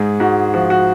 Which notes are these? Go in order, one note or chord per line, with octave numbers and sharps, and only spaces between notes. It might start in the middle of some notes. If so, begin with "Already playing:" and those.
Already playing: G#2 G#4
G#2 F#4
F3 F#4
F#4